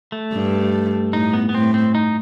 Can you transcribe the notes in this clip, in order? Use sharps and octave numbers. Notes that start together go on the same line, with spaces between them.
A3
G2
A2 D#4
B3
B3
A2 C4
C4
D#4